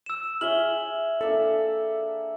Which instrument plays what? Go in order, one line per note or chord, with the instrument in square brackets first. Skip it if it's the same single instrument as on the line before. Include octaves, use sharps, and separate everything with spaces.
[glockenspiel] E6 E7
[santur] G#4 C#5 E5 [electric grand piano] F6 [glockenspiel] F#7 G7
[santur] A#3 D4 E5 [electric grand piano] A4